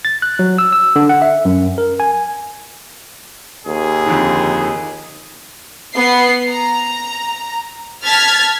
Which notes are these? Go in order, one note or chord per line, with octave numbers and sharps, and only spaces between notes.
A6
F#6
F#3
E6
E6
D3
F#5
E5
F#2
A#4
G#5
D#2 G#4
F2 D3 D#3
B3 C7
A#5
A5 F6 G#6 A6 B6